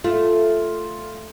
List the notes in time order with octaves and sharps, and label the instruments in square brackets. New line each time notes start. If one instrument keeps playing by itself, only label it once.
[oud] A3 [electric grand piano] F4